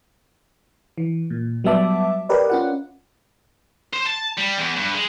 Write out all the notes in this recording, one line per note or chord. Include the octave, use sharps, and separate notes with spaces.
E3
A#2
F#3 G3 B3 E5 A5 D6
G4 A#4 B4 D5 D#5
C#4 F4 F#5
C5
A5
G3
E2
G2
G#3